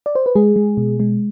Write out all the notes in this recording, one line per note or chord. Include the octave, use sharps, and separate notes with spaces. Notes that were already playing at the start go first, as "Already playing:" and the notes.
D5
C5
B4
G#3 G#4
G#3
B2
G#3